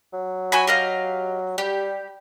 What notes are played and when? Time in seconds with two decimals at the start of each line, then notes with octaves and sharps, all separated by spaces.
0.13 F#3
0.52 F#4 G#5 B5
0.67 G4 D#5 F5
1.58 G3 G4